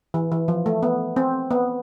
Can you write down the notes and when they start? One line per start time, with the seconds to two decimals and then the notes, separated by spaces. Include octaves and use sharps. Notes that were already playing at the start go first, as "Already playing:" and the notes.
0.14 E3
0.32 E3
0.48 F3
0.66 A3
0.83 B3
1.16 C4
1.51 B3